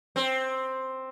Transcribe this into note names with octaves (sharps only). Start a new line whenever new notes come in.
C4